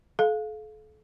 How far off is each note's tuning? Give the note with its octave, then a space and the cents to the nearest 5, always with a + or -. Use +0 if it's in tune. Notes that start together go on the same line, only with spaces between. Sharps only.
A4 -40 F5 +0